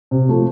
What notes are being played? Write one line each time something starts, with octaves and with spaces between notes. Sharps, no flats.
C3
F3 A3